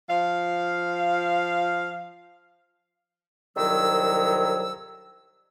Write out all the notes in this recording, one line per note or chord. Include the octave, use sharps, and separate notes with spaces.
F3 F5
C2 F2 D#3 F#3 E6